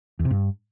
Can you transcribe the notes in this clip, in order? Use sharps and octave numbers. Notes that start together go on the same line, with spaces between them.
E2
C3
G2